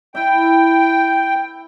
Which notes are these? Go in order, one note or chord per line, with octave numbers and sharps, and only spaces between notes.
E4 E5 G5